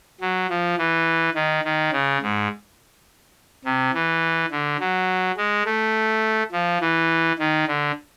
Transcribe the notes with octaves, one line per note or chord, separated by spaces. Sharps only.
F#3
F3
E3
D#3
D#3
C#3
G#2
C3
E3
D3
F#3
G#3
A3
F3
E3
D#3
D3